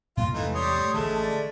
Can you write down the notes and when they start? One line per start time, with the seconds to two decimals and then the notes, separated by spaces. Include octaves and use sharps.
0.17 A2 G#3 A#3 F4
0.34 E2 G#2 C3 E3 A3 D#4
0.54 G3 C#5 C6 D#6
0.78 A3
0.94 A1 D3 G#3 A3 A5
1.22 D5